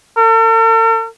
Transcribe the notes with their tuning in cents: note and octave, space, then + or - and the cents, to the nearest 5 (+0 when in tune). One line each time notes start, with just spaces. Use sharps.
A4 +45